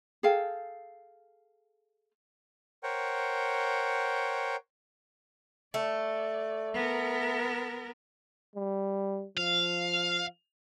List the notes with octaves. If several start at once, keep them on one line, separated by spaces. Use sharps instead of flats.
G#4 A4 F5 G5
A#4 C5 C#5 F#5 G5
A3 D5
B3 A#4
G3
F3 F5